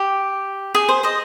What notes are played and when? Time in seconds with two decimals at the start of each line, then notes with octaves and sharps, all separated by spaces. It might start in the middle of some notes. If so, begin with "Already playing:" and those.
Already playing: G4
0.75 G#4
0.89 C5
1.03 C5 D#5